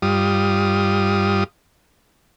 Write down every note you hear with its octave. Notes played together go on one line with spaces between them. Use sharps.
G2 G3 F4 D#6